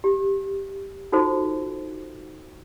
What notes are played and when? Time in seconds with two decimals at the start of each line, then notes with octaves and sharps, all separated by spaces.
0.04 G4
1.12 D#4 F4 F#4 A4 C5